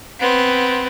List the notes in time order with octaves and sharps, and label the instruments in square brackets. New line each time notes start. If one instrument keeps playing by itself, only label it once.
[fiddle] B3 C4